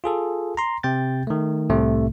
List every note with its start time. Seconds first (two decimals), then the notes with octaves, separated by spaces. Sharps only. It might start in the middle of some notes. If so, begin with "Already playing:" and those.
0.04 F4 G#4 A4
0.57 A#5 C6
0.83 C3 G5 G6 A6
1.27 D#3 A3
1.70 C2 A2 C3 A3